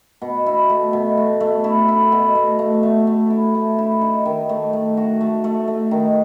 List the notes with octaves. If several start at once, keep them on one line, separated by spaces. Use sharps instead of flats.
B2
E4
A3
B2
A3
A3
E4
E4
B2
A3
A3
A3
A3
E4
A3
E4
D#4
D#3
A3
A3
F#4
A3
A3
A3
D#3